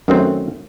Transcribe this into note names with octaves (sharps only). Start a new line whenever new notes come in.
F#2 D#3 F#3 A3 C4